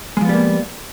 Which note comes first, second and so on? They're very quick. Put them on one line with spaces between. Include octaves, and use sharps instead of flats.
G#3 F3 B3 G3 A#3